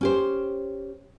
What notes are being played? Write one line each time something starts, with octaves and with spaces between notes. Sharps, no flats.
C#4 G4 C5